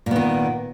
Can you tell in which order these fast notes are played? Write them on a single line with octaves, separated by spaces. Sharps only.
A#2 B3 D#3